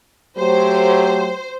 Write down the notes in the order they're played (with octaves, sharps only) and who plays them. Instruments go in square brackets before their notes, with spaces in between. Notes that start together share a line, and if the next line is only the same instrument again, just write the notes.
[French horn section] F#3 A3 G4 [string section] C5